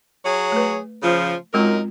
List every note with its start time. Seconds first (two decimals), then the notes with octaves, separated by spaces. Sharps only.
0.25 F#3 G#4 C#5
0.52 A3 B4
1.03 C#3 F3
1.54 F#2 G#3 C4 D#4 F4 A#4